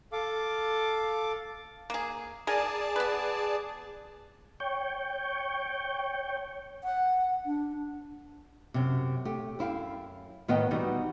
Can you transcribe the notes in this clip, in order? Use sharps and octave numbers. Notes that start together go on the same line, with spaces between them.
A4 F5 D6
A#3 G#4
G#4 A#4 D5 G#5 A5
B3 B4
C#5 G5
F#5
D4
F#2 C3
A3 G4
F#2 E4 F5 G5
A2 D#3 B3 B4 D#5 G5
E3 G3 B3 D#4 F#4